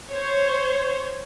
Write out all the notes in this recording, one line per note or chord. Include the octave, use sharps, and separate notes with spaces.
C5 C#5